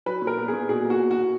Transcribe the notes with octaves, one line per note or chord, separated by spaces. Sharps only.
F#3 B4
A#2
A#4
B3
G#4
A#2
B2 G#4
A#3
F#4
B2
F#4
B2